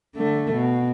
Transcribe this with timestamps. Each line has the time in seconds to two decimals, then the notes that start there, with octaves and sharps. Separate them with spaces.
0.16 D3 A3
0.53 B2